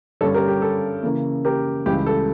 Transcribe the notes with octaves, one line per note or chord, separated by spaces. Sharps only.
G2 D3 G3 C#4 A4 C#5
G4 A#4
G4
A4
C#3 E3 A#3
G4 A#4
C#2 C#3 E3 G3 G4
A4